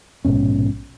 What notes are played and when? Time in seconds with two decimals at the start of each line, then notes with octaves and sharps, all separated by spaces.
0.25 A#1 G#2 B2 C#4